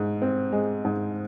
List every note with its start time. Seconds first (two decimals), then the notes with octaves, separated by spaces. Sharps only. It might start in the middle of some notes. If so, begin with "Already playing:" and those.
Already playing: G#2
0.22 C4
0.52 G#3
0.85 G#2